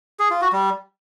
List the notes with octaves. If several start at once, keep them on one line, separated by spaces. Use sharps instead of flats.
G#4
F4
F#4
G3